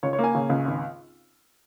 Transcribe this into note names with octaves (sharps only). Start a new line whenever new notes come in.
C#2 C#5
C#5
A#3
G#5
C#3
C#2
G#1